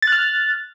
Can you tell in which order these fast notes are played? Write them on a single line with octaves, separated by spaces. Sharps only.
A6 F#6 F6